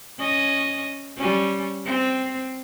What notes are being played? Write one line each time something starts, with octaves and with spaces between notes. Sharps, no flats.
C#4 D#5
G3 C#4
C4